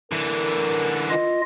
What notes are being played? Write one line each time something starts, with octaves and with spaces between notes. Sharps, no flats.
D3 E3 A#4
F4 D#5